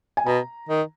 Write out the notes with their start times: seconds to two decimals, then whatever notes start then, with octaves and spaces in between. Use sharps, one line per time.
0.17 G#5
0.26 B2 A#5
0.69 D#3